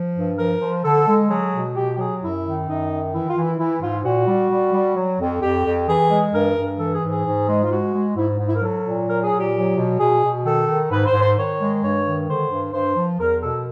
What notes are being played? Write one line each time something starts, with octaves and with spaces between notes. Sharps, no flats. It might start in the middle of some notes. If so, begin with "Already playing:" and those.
Already playing: F3
G2
F3 A#4
F3
D3 A4
G#3
F#3 G#4
B2
B2 G4
G4
F#3 G#4
F#2 E4
D#3
F#2 D#4
D#3
E3 E4
F4
E3
E4
E3 E4
G#2 F4
A#2 F#4
G3
G3
G3
F#3
F2
F2 G4
F2
E3 G#4
G#3
G2 A#4
G2
E3 A4
G#4
G#2
G#4
G#2
G#3
F4
G#3 F#4
G#3
G#2 E4
G#2
E4
A#4
F#3 A4
A#2
F#3 A#4
G#4
A#2
G4
F#3
B2
B2 G#4
B2
D#3 A4
D#3
G#2 B4
C5
G#2
C5
D#3 C#5
G#3
G2 C#5
D#3
D3 C5
G2
G2 C5
F3
E2 A#4
B2 A4